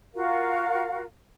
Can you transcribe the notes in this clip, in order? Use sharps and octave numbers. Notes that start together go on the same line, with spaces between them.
F4 F#4 A#4 F5